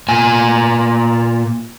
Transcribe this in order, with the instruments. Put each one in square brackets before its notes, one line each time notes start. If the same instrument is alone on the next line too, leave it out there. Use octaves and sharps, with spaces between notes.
[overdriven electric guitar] A#2 G#5